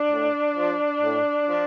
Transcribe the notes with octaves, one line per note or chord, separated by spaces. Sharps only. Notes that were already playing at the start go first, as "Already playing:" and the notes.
Already playing: D4
A2
F3
A2
F3